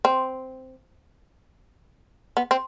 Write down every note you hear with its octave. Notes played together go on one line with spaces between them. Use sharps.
C4
B3
C4